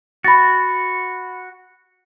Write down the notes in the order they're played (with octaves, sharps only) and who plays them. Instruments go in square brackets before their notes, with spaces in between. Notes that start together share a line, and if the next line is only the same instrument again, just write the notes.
[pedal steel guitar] F#4 [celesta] B5 A6